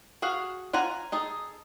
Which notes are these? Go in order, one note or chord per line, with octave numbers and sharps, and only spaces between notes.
F#4 G#4 F5 F#5
F4 F#5 G#5 A#5
D#4 G#4 A4